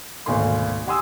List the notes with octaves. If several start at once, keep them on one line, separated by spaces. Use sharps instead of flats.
G#1 D2 B2 A#3 G#5 C6
G4 F#5 G#5 C6 D#6 E6